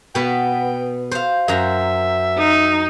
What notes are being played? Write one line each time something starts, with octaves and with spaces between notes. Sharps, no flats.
B2 B3 G5
C5 F5
F#2 C5 E5 A#5
D#4